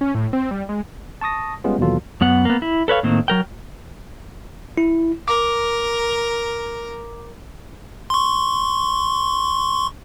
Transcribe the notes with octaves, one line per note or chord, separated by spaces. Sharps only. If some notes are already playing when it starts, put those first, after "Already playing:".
C#4
A2
C4
G3
G#3
A5 C#6 D#6 A#6
G3 G#3 B3 C#4 F4
D#2 B2 E3 F#3 F4 A4
F#2 B3 F#5
A#3 B3
E4
A4 B4 C#5 F5
A2 D#3 A#3 C4
F#3 A#4 G5
E4
A#4 D6
C6 C#6